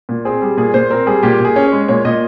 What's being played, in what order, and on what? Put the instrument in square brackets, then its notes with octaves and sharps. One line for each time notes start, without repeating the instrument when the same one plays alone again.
[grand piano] A#2
C4 G#4
G3
A#2 G#4
A#2 C5
C4 A#4
G3 G#4
A#2 G4
A#2 G#4
C#4
C#5
G#3
A#2 C#5
A#2 D#5